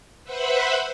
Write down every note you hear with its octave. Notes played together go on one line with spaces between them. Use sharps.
B4 C5 E5 F#5 B5